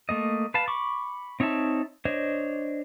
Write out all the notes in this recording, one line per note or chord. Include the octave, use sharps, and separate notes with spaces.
A3 A#3 D#5
B4 F5 A5
B5 C#6 D6
C4 D#4 C#5 E5 A5
D4 C5 C#5 D#5